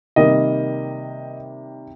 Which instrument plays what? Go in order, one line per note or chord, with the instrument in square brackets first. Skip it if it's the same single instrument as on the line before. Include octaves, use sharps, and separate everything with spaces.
[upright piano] C3 D#3 G3 A#3 D#5